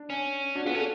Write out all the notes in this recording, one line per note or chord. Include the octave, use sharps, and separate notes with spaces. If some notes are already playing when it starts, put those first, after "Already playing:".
Already playing: D4
C#4
D4 F#4
B3 F4 G#4
C#4 F#4 A4